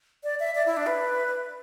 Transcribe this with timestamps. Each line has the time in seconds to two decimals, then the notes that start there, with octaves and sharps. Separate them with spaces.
0.24 D5
0.40 E5
0.55 D5
0.66 E4
0.77 D4
0.87 B4